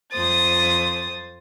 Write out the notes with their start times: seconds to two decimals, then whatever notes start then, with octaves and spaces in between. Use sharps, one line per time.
0.12 F2 C5 D#6 A6